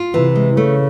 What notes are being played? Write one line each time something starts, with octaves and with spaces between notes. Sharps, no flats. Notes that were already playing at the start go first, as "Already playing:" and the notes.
Already playing: F4
C3 E3
G#3
C#3 A3